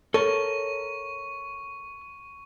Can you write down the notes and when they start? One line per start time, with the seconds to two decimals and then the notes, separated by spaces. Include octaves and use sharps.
0.14 A4 A#4 C#5 C#6